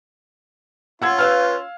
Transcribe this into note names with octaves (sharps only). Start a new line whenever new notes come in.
C#4 F4 F#5 E6 G#6
B4 F5 E6 F6